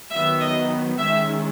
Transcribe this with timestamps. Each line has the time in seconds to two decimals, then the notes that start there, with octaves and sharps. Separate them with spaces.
0.11 D#3 F#3 B3 E5
0.40 D#5
0.98 D#3 G#3 C#4 E5